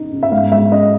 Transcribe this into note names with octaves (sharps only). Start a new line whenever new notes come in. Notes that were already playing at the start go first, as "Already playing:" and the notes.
Already playing: C#3 D#4
C#3
E5
G#2 F5
G#3 E5
C#4 D#5